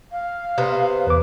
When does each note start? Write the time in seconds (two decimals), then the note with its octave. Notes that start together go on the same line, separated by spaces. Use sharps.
0.12 F5
0.58 C3 B3 C5
1.07 E2 B4 D6